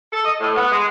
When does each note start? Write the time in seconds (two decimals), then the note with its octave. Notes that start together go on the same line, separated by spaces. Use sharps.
0.13 A4
0.25 D#5
0.41 A2
0.56 B3
0.71 G#3